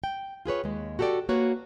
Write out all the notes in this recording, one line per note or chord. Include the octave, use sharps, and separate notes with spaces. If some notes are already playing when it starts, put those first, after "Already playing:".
G5
F4 G#4 B4 C#5
D#2 G#3
F#4 G4 A4 C5 D5 G5
A#3 F#4 B4 C#5